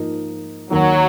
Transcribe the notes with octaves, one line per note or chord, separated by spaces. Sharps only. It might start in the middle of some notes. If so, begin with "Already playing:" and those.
Already playing: G#2 F3 A#3 D#4
D#2 D#3 F#3 A#3